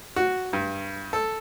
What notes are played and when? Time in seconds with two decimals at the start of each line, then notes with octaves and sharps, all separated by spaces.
0.16 F#4
0.53 G2
1.13 A4